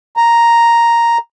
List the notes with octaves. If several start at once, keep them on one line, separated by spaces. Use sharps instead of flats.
A#5